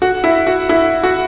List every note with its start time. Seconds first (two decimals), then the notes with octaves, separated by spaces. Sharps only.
0.02 F#4
0.24 E4
0.47 F#4
0.69 E4
1.03 F#4